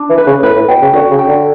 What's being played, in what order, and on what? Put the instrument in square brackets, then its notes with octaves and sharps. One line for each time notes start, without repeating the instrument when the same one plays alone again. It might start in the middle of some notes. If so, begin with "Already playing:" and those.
Already playing: [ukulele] D4
[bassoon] E3
[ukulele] B4
[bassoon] C#3
[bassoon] A2 [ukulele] B4
[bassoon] A2
[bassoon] B2 [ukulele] G5
[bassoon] C#3
[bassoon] D3 [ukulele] F#4
[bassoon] C#3
[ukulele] G5
[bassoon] D3